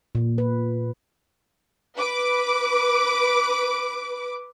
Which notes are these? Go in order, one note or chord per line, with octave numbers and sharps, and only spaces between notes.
A#2
B4
B4 D6